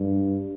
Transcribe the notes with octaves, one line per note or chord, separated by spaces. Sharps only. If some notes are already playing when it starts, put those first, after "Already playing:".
Already playing: G2